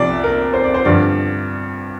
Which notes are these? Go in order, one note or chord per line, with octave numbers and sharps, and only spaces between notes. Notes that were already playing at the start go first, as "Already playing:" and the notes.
Already playing: C2 C3 F3 D5
A#4
C5
D5
C5
G2 D3 F3 D5